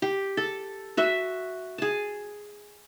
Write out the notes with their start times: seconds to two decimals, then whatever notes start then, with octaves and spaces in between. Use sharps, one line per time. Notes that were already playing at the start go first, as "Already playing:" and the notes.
0.02 G4
0.37 A4
0.97 F#4 E5
1.78 G#4 A5